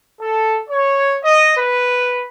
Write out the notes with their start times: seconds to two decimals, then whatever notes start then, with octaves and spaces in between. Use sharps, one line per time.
0.21 A4
0.70 C#5
1.24 D#5
1.58 B4